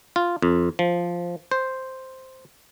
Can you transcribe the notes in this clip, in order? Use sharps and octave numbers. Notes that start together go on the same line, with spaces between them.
F4
F2
F3
C5